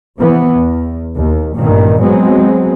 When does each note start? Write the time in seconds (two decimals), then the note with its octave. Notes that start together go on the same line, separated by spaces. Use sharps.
0.19 C3 E3 B3
0.53 E2
1.16 D#2
1.56 A1 G2 A#2 D#3
2.01 F#3 G#3 B3 C4